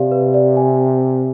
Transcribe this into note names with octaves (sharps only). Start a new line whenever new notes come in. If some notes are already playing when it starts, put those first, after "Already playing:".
Already playing: C3 G4 D5 F5
B4
D5
G#5